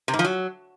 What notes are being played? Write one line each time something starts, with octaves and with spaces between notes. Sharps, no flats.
C3
G#2
F3
F#3